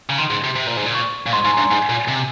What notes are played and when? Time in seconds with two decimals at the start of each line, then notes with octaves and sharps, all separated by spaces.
0.09 C#3 A#5
0.18 D#3 C6
0.30 G#2
0.44 C3
0.56 C3
0.67 A#2
0.77 G#2
0.86 A#2
0.94 C#6
1.26 A#2
1.33 G#2 C6
1.45 G#2 G#5
1.54 A#5
1.58 G2 C6
1.71 G#2 G#5
1.89 A#2
2.08 C3